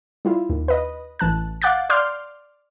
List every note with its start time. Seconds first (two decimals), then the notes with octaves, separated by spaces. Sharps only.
0.25 G3 E4 F4
0.50 D#2
0.68 B4 D#5
1.19 A1 E3 A5 F#6
1.62 F5 F#5 D6 F#6 G6 A6
1.90 D5 C6 D6 F6 G6